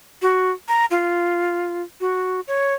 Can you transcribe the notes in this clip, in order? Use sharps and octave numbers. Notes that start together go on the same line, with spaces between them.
F#4
A#5
F4
F#4
C#5